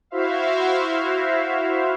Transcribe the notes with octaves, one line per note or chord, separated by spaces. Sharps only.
E4 F#4 C5 E5 F5